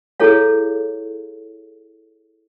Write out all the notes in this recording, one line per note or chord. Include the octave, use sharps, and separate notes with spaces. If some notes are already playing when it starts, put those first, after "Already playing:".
E4 G#4 A4 C#5 F5